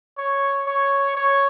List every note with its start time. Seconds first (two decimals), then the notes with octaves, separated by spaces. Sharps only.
0.18 C#5
0.66 C#5
1.15 C#5